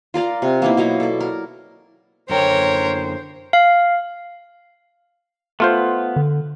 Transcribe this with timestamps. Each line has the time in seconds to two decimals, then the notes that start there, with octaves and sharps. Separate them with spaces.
0.14 F4 A#4 D5 A#5
0.42 C3
0.62 A#3 B3 D#4 E4
0.77 B2 F#3 A#3 A#5
1.00 A4 D5
1.20 A#4
2.29 F#2 D3 A#4 C5 C#5 G5
3.53 F5
5.60 A3 B3 F4 C5
6.16 D3